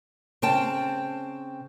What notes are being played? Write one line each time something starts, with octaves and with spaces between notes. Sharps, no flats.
C#3 C4 G5 A5